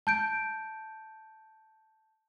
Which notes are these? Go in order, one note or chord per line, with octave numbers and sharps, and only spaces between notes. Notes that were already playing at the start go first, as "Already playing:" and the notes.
A5 G6 D7